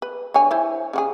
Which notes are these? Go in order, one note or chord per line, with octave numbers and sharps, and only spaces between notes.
B4
D3 C#5 G#5
E4 C5
C#3 F#4 G#4